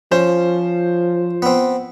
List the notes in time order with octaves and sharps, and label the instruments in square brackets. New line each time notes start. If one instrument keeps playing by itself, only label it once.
[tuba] F3 [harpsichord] C#4 [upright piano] C5
[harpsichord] B3 C4